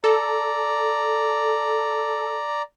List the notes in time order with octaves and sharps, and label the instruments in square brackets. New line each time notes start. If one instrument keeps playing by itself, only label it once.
[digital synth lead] A4 [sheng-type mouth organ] D5 A#5